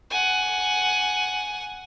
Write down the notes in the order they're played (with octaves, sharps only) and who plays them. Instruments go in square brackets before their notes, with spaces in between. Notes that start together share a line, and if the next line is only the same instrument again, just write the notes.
[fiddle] F#5 G#5